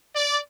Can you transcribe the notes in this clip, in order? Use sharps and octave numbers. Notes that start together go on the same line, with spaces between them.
D5